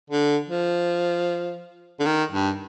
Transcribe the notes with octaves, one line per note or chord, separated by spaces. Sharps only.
D3
F3
D3
D#3
G2